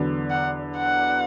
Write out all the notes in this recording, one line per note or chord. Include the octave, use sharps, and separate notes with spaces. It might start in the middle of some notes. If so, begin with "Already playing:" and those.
Already playing: E2 D3 F#3 B3
F#5
F#5